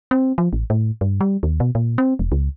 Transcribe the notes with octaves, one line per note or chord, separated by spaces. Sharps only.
C4
F3
A1
A2
G2
G3
D#2
B2
A#2
C4
E1
C#2